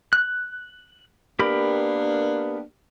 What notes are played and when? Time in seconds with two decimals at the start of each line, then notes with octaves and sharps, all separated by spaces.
0.13 F#6
1.39 A#3 B3 D4 G4 A#4 B5